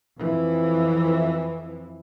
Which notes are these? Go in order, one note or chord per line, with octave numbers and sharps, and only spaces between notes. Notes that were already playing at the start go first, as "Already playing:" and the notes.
F2 E3